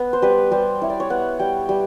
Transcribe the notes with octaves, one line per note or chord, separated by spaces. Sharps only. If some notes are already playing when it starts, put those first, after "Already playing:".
Already playing: B3
C5
G3 B4
G3 C5
E4 C#5
D5
C#5
B3 F#5
G3 G5
G3